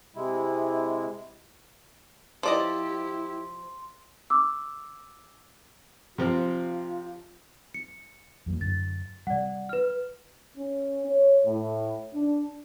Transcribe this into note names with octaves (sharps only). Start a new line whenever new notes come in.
C3 G#3 E4
F3 E4 G4 D5 D#5 C6
D6 E6
C3 F3 C4 F4
C#7
F2 F#3 A#3
F#2 D3 A6
C3 G3 D5 F#5
B4 F6
C#4
C#5
A2
D4